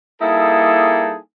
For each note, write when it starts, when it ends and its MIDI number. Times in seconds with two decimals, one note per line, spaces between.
0.21 1.16 55
0.21 1.16 58
0.21 1.16 63
0.21 1.16 64
0.21 1.16 68
0.21 1.16 69